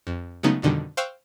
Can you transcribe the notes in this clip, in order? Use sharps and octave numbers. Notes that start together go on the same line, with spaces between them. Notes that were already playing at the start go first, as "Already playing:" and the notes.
F2
C#3 F#3 G#3 A3 B3 D#4
F2 B2 D3 D#3 G3
C5 F5 G5 C#6 E6 F#6